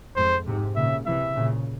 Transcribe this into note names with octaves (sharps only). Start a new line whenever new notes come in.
F2 G#2 C5
G#2 C3
A#2 C#3 E5
C3 E3 E5
A#2 C#3